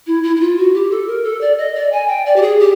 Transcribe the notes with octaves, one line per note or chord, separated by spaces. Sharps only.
E4
E4
E4
F4
F#4
G4
A4
A#4
A4
D5
D#5
D5
G#5
G5
D5
G4
G#4
G4